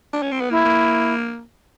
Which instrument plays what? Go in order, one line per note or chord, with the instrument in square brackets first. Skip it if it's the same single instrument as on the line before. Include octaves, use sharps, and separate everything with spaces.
[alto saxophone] D4
C#4
C4
B3
[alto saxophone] A#3 [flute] E4
[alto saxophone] A#3